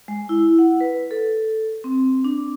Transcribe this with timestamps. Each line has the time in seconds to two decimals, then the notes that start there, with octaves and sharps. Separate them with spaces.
0.08 G#3
0.29 E4
0.59 F#5
0.81 B4
1.11 A4
1.84 C4
2.24 D4